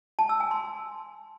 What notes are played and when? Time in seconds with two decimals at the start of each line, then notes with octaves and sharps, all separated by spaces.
0.19 A5
0.29 E6
0.40 G#5
0.51 C6